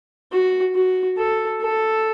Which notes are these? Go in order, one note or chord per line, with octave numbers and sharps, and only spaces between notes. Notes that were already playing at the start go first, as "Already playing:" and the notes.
F#4
F#4
A4
A4